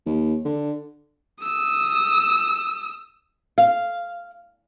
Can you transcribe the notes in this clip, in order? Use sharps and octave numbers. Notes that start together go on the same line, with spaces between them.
D#2
D3
D#6 E6
F5